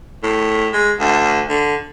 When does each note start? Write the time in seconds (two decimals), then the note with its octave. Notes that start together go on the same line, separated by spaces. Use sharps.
0.23 A2
0.73 G#3
0.99 D2
1.49 D3